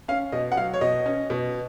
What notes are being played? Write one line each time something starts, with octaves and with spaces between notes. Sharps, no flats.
C#4 F5
B2 D#5
F#5
F#3 F5
C#5
B2 D#5
C#4
B2